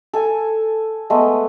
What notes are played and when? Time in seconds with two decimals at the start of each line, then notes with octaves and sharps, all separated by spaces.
0.13 A4 G#5
1.10 G#3 A3 B3